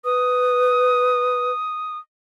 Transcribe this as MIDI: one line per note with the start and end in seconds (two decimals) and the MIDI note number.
0.05 1.52 71
0.05 1.98 87